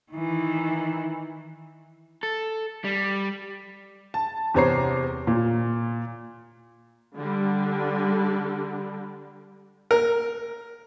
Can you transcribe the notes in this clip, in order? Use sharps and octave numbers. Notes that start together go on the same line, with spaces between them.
D#3 E3
A4
G3
A5
E2 C3 C5 C#5 A#5 C7
A#2
D3 G3
A#4